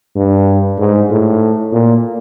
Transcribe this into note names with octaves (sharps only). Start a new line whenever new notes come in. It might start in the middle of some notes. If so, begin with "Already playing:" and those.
G2
G#2
A2
A#2